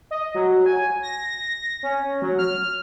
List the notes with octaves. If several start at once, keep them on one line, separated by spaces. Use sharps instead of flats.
D#5
F#3
G#5
A#6
C#4
F#3
F6